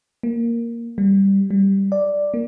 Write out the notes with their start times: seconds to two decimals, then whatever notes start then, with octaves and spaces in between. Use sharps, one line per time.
0.23 A#3
0.98 G3
1.51 G3
1.92 D5
2.34 A#3